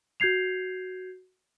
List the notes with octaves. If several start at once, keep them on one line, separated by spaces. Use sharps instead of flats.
F#4 G6 G#6 C7 F7